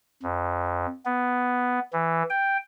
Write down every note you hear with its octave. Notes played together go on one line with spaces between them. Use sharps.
F2
B3
E3
G5